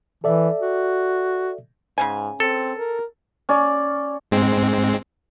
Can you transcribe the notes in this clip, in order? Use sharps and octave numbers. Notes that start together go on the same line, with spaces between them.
E3 A4 D5 E5
F#4
G#2 C#3 C#4 G#5
C4 A4
A#4
C#4 D5
G#2 G#3 C4